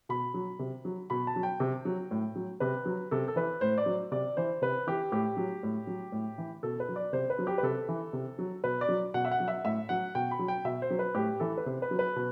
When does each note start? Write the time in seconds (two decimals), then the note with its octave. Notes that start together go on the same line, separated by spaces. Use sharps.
0.09 B2 B5
0.34 F#3
0.59 C3
0.85 F#3
1.10 B2 B5
1.27 A5
1.36 F#3
1.43 G5
1.60 C3
1.85 F#3
2.11 A2
2.36 F#3
2.60 C3 B4
2.86 F#3
3.11 C3 A4
3.28 A4
3.36 E3 B4
3.61 A2 C5
3.78 D5
3.86 F#3
4.12 C3 D5
4.37 E3 C5
4.62 C3 B4
4.87 E3 G4
5.12 A2 G4
5.37 F#3
5.63 A2
5.87 F#3
6.12 A2
6.38 E3
6.63 B2 A4
6.80 B4
6.89 F#3
6.96 D5
7.13 C3 C5
7.30 B4
7.39 F#3
7.47 G4
7.58 B4
7.63 C3 A4
7.89 E3
8.13 C3
8.39 F#3
8.64 B2 B4
8.81 D5
8.89 F#3
9.14 B2 F#5
9.25 E5
9.31 F#5
9.40 F#3
9.48 E5
9.64 A2 E5
9.89 F#3 F#5
10.15 B2 G5
10.31 B5
10.39 F#3
10.48 G5
10.65 B2 E5
10.82 C5
10.90 F#3
10.99 B4
11.15 A2 G4
11.40 E3 A4
11.58 B4
11.66 C3 C5
11.82 B4
11.91 F#3
11.99 B4
12.16 B2